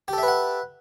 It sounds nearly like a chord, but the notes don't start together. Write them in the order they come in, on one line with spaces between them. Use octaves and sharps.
G4 A4 E5 B4 F#5